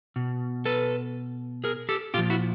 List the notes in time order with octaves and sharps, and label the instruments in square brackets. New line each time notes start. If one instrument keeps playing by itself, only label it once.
[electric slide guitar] B2
A4 B4
G#4 A#4
G4 A4
A#2 F4 G4
F3
E4 F#4